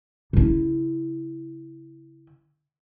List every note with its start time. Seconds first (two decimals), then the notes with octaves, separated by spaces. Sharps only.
0.33 C#3 E4